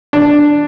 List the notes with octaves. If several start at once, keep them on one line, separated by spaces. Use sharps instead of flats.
D4